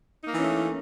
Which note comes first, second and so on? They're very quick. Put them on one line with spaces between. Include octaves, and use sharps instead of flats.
D#4 A#3 E3 C#4 A3